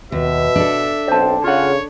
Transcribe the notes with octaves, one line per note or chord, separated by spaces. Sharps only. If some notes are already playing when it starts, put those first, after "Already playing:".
D#2 B2 E5
D4 A4
B1 C4 C5 A5
C#3 F4 C#5 F#5